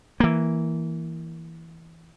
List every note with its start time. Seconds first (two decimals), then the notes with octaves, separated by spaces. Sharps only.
0.20 E3 A#3